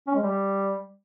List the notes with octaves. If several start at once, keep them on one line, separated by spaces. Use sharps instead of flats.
C#4
G#3
G3